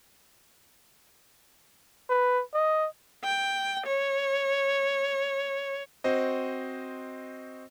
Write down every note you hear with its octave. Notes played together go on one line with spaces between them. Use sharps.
B4
D#5
G5
C#5
C4 F#4 C5 D#5